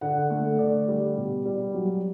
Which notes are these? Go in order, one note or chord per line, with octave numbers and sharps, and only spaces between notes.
D3 F#5
A3
D3 D5
G3
B2
G3
F#3